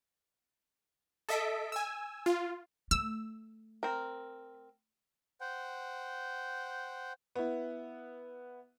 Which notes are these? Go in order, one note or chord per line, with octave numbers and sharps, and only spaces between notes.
A4 D#5 E5 B6 D7
G#5 E6
F4
A3 E6
C4 A#4
C5 F#5 G5
B3 E4